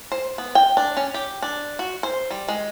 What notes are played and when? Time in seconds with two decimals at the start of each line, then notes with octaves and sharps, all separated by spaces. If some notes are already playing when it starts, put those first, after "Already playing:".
0.12 C5
0.38 B3
0.55 G5
0.77 D4
0.97 C#4
1.14 G4
1.42 D4
1.79 F#4
2.03 C5
2.31 G3
2.48 G#3